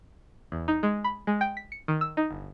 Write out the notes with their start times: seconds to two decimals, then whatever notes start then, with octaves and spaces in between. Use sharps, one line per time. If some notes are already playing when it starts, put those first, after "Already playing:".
0.52 E2
0.68 D#4
0.83 G#3
1.04 B5
1.27 G#3
1.41 G5
1.57 B6
1.72 C#7
1.88 D#3
2.01 E6
2.17 D#4
2.30 G1